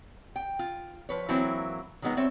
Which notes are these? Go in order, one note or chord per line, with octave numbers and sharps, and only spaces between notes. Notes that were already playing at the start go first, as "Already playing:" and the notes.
G5
F4
F3 B4 C#5
E3 F#3 A#3 C4 E4
D#3 F#3 G#3 B3 D#4
G3 C4 C#5 E5